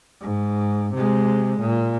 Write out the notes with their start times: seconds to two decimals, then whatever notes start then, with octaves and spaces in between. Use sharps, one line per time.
0.21 G#2
0.95 C3 G#3
1.60 A#2